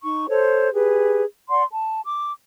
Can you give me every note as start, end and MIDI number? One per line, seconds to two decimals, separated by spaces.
0.02 0.25 63
0.02 0.25 85
0.29 0.72 69
0.29 0.72 72
0.29 0.72 73
0.73 1.23 67
0.73 1.23 68
0.73 1.23 71
1.50 1.63 74
1.50 1.63 78
1.50 1.63 84
1.70 2.01 81
2.05 2.33 86